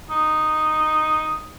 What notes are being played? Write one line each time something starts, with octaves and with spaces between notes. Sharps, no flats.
D#4